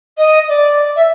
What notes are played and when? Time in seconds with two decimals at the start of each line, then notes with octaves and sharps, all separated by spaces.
0.17 D#5
0.49 D5
0.96 E5